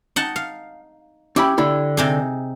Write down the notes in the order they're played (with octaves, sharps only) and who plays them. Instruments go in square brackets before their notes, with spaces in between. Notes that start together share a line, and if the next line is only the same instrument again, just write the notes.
[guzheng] D#4 F#5 A5
F5
[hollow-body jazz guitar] C#4 E4 B5 [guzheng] G4
[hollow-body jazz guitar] D3 E4
[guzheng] C3 D#4 G#4